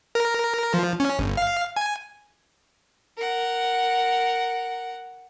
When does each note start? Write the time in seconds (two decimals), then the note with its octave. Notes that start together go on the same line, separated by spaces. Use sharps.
0.15 A#4
0.74 F3
1.00 C#4
1.19 G1
1.37 F5
1.76 G#5
3.17 A#4 F#5